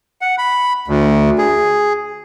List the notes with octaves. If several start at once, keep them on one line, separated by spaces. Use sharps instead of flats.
F#5
B5
D2
G#4